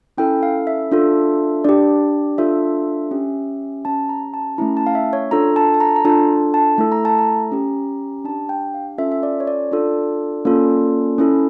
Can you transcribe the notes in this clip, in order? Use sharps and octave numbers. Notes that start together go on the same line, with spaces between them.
C#4 E4 A4 G5
F5
E5
D4 F4 A4
D4 G4 D5
D4 F4 A4 E5
C#4 G4
C#4 G4 A5
A#5
A5
A3 C#4 E4 A#5
A5
F5
E5
C#5
D4 F4 A4 A#5
A5
A5
A#5
A#5
D4 F4 A4 A5
A5
A3 E4 A4
A#5
A5
A#5
C#4 G4
D4 G4 A5
G5
F5
C#4 F4 A4 E5
E5
D5
C#5
D5
D4 F4 A4
A#3 C#4 F4 A4
C#4 E4 A4